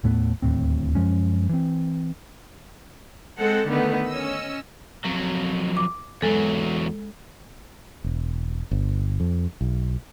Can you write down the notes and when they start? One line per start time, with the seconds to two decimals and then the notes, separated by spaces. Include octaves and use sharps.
0.03 D#2 A2 A3 B3
0.42 D1 D#2 A2 C4
0.95 F#2 F3 G#3 C#4
1.49 E3 C4
3.37 G#3 C4 A4 F#5
3.69 D3 D#3 A3 B3
4.07 C#4 D#5 E6
5.05 F2 F#3
5.77 D6
6.22 E2 F#3 G#3 A4
8.04 E1
8.71 G1
9.20 F2
9.61 B1